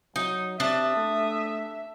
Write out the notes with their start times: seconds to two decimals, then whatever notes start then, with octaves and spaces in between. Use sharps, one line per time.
0.16 F#3 D#4
0.60 C3 D4 E5 A5 D#6
0.97 A3